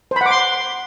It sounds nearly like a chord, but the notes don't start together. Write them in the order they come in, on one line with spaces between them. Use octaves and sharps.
C5 B5 F#5 D6 C6